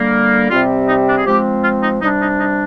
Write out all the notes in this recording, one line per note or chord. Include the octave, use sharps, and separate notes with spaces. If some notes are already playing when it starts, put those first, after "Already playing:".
Already playing: D3 G3 A#3
C3 G3 C4 F4
D#4
D4
G#4
F3 G#3 C4 G4
F4
D#4
C3 G3 D4 D#4
D#4
D#4